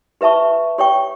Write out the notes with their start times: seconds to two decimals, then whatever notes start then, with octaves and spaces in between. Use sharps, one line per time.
0.21 G4 B4 E5 A5 C#6
0.78 G4 C#5 G5 C#6